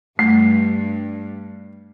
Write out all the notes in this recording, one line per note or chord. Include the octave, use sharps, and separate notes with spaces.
G2 A3 C7